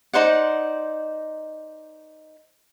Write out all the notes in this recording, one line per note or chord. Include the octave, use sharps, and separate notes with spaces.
D#4 C5 D5 F#5